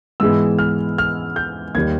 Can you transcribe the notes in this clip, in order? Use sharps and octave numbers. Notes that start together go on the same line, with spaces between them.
G#2 E3 G#3 B3 E6
F6
F6
G6
D#2 D#3 G3 G#6